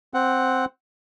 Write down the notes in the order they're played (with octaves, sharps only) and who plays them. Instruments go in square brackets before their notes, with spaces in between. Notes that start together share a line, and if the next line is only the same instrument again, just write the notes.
[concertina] C4 F#5